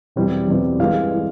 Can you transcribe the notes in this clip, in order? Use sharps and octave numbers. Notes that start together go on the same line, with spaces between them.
E2 B2 G3 C4 E4
E2 B2 G3 C4 E4
G2 E3 G#3 F5
E3 G#3